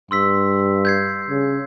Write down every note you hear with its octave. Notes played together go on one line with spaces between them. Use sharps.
G2 C6 E6 B6
G6 G#6 C7
C#3